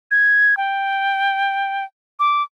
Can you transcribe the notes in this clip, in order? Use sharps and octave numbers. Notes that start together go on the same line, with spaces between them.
G#6
G5
D6